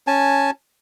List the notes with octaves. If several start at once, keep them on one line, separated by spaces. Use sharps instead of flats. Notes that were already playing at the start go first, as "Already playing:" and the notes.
C#4 G#5 A5